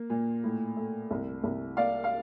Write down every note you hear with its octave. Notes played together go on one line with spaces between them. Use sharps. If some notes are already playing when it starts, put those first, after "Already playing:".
Already playing: A#3
A#2
A2
A3
C2
C2
A#3 D5 F5
F5